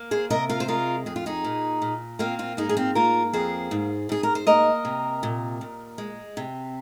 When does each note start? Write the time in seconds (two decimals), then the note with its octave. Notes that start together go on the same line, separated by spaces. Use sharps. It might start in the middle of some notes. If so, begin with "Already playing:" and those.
Already playing: A#3
0.11 G#4 C5
0.30 C3 A#4 D#5
0.49 F4 A#4
0.60 C5
0.68 G#3 F4 A#4
1.06 F2 G#4
1.16 F4
1.26 D#4 G#4
1.44 A#2
1.82 A#2
2.19 A#3 C4 F4
2.39 C4 F4
2.57 G#2 D#4 G#4
2.69 G#4
2.77 C4 F4
2.95 A#3 F4 A#4
3.33 F2 G#4 C5
3.71 G#2
4.09 G#2 G#4
4.23 A#4
4.35 C5
4.47 A#3 A#4 D#5
4.85 C3
5.23 A#2
5.61 A#2
5.98 G#3
6.37 C3